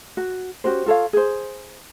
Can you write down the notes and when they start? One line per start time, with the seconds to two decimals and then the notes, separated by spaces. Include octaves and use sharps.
0.17 F#4
0.64 C#4 F#4 G4 C5
0.86 F4 A4 C#5 F5
1.13 G#4 C5